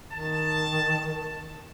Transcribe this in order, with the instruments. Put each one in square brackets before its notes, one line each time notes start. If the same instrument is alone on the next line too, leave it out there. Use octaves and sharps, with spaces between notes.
[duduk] D#3 [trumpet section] A5